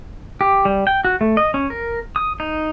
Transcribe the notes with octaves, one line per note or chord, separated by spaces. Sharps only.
G4
G3
G5
F#4
A3
D#5
C#4
A#4
D#6
D#4